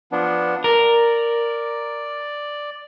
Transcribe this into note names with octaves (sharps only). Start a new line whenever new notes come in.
F3 B3 D4
A#4 D5